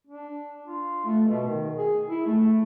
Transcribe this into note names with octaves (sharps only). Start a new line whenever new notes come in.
D4
F4
A3
B2
D#3
G#4
E4
A3